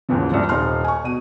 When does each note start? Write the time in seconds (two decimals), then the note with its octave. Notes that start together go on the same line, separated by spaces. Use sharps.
0.09 D#2 G#2 C#3 E3 F3
0.32 C2 G2 F3
0.49 D#1 D#4 C6 F6
0.84 G#5 C#6
1.04 B2 D#7